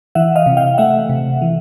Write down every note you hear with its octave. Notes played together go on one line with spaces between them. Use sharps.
E3 E5 F#5
D#5 F5
C3
F5 G5
A3 E5 F#5
C3
E3